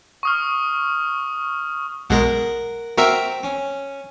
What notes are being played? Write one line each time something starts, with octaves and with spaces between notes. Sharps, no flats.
C#6 D#6 F6
B1 B2 G#3 A#4 F#5
C4 F#4 A#4 E5 G5
C#4